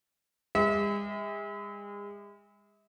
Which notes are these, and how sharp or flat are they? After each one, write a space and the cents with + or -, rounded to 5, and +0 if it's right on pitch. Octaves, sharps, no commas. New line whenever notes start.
G#3 -40 E5 -40